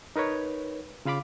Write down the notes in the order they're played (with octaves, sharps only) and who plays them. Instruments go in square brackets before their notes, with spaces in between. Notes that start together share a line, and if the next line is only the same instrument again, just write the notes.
[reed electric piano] D#4 A#4 B4 C#5
C#3 F4 F5 B5 D6